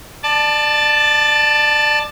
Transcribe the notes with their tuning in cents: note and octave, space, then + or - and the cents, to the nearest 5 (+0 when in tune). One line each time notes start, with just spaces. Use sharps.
D5 +25 A5 +0